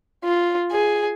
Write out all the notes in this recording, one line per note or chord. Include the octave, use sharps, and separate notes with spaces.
F4
G#4